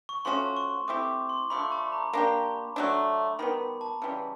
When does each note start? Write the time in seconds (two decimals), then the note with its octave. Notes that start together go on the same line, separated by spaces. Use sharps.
0.09 C#6
0.25 F3 A3 C#4 F#4 C6
0.57 C#6
0.88 A3 C4 E4 G4 D6
1.29 C6
1.50 D3 F3 A3 B5
1.72 A5
1.92 A#5
2.13 A#3 D4 G4
2.76 F#3 A3 D4
3.39 D#3 G3 B3 B5
3.81 A5
4.02 C#3 E3 G3